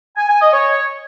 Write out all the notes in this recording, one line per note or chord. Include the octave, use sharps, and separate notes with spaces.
G#5
G#5
D#5
C#5